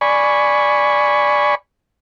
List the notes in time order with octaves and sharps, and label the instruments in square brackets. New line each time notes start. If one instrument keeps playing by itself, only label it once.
[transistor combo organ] D5 G#5 B5 C#6